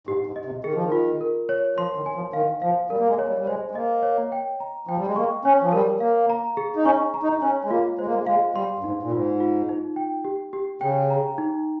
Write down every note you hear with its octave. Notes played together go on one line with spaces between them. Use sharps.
G#2 G4
G#2
D#5
C3
D#3 G#4
F3
D#3
F4
A#4
C#5
F3 C6
D#3
G#5
F3
D#3 F5
F3 F5
G3 A#4
A#3
G#3
C#5
G3
G3
G#3 C5
G#3
A#3 D#5
C#5
G5
A#5
F3 G5
G3
G#3
A#3 C#6
C#4 C#5
F3
G3 A#4
A#3 F5
A#5
G#4
D#4
C#4 C#6
A#5
D#4
C#4 C#5
G#3
A#3 F4
G#3 C5
A#3
G#3
G#3 F5
G3 C6
G2
G#2 D#4
A#2
G#2 F4
F4
D#4
G5
G4
G4
C#3 G5
A#5
D#4